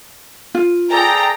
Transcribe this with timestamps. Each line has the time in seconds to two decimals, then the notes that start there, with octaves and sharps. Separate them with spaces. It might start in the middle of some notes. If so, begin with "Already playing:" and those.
0.55 F4
0.92 G#4 A4 D5 G5 A#5